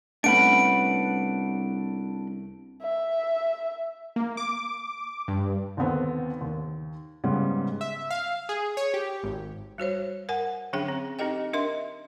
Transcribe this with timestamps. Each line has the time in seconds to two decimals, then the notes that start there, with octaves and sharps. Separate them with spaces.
0.24 C2 A3 B3 C#4 D4 F#5 B5 D7
2.82 E5
4.16 A#3
4.37 D6
5.28 G2
5.77 D#2 D3 B3 C4
6.41 D#2
7.24 G#2 C#3 G3 B3
7.81 E5
8.10 F5
8.49 G#4
8.77 C#5
8.94 G4
9.23 G#1
9.78 G3 F#4 C5 C#5
10.29 A#4 F#5 G#5
10.73 D3 F#3 C#4 D4 G#4 G5
10.88 C4
11.19 C4 D#4 G4 A4 D#5 G5
11.53 D4 A#4 D#5 E5 C6